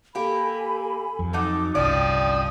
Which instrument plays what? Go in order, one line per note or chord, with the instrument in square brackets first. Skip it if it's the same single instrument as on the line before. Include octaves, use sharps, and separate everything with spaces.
[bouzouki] A#3 G4 [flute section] A4 G#5 B5
[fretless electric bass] F2
[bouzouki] F#3 D#4 A4 [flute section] D6
[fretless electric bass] G1 C2 [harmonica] F3 D#6 [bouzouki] C#4 D5 D#5 [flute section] G5